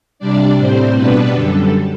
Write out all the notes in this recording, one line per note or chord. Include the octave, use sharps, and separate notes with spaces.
C3 G3 D4 D5
A2 G3 C4 C5
B2 G3 B3 D4 B4
F#2 D3 G3 A4